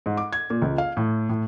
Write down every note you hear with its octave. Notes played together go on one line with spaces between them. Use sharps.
G#2
D6
G#6
A#2
C#2
F5
A2
A2